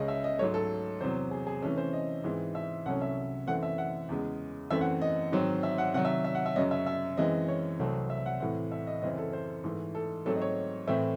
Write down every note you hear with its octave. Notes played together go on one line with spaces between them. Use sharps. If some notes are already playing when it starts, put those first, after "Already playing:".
Already playing: C#2 C#3 G#3 C#4 D#5
E5
D#5
G#2 F#3 A3 C#5
A4
E2 C3 F#3 C5
G#4
G#4
C3 E3 A3 C#4 A4
C5
D#5
G#2 E3 G#3 C4
E5
C2 C3 F#3 A3 C#4 F#5
E5
F#2 E3 A3 C4 F#5
E5
F#5
E2 C#3 G#3
F#2 E3 A3 C4 E5
F#5
D#5
G#2 D#3 F#3 C4
E5
F#5
C3 D#3 F#3 F#5
E5
E5
F#5
E5
F#2 C#3 F#3 C#4 D#5
E5
E5
F#2 E3 G#3 C4 D#5
C#5
C2 C3 F#3 A3 C4
E5
F#5
A2 E3 C4 F#5
E5
D#5
F#2 C#3 E3 C4 D#5
A4
C5
G#2 E3 A3
A4
G#2 F#3 A3 C4 A4
D#5
C#5
A2 E3 A3 C4 E5